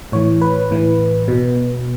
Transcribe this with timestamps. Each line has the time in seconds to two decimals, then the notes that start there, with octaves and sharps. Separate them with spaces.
0.12 A2 E3 C#5
0.41 B4
0.71 A2 E3
1.28 B2